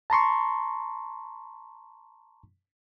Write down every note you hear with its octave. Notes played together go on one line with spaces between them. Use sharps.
A5 A#5 C6 C#6